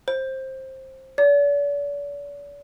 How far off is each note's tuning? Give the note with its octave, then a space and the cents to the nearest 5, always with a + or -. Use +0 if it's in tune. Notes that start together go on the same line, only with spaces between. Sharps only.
C5 +15
D5 -45